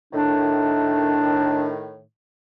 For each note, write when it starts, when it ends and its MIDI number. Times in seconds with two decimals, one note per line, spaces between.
0.13 2.00 45
0.13 2.00 51
0.13 1.71 62